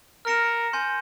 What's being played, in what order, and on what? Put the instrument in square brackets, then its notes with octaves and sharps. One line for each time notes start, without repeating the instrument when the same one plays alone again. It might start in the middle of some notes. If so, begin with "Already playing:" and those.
[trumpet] A#4 [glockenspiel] F6 A#6 C#7 E7
[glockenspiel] G#5 C6 G6